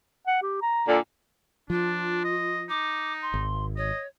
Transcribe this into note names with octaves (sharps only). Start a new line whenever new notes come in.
F#5
G4
A#5
A#2 D3
F3 D4 F4
D#5
D#4 D6
C6
G#1
C#5 D#5